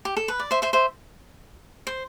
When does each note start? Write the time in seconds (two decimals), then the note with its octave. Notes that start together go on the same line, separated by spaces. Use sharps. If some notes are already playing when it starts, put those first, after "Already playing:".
0.05 G4
0.17 A4
0.28 B4
0.40 D5
0.51 C5 E5
0.62 C5 E5
0.73 C5 E5
1.87 C5